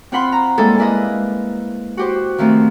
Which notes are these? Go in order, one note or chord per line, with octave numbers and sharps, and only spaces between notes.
C4 F4 F#5 B5 C6
A#5
G3 G#3 A#3 E4 G#4 A4
G#3 A#3 E4 B4 D#5
F#4 G4 C5
D#3 F3 A3 C4